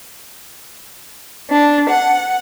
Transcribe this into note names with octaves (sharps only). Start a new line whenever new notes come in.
D4
F#5